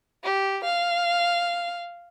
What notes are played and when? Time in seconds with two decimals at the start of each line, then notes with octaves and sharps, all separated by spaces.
0.24 G4
0.65 F5